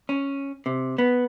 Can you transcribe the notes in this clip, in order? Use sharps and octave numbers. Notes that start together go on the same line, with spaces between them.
C#4
C3
B3